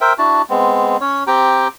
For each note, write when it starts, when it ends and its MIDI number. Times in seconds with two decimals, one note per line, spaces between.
0.01 0.13 70
0.01 0.13 72
0.01 0.13 76
0.01 0.13 79
0.18 0.42 62
0.18 0.42 64
0.18 0.42 66
0.18 0.42 81
0.50 0.97 56
0.50 0.97 59
0.50 0.97 60
1.01 1.24 61
1.01 1.24 73
1.27 1.68 60
1.27 1.68 67
1.27 1.68 79
1.27 1.68 82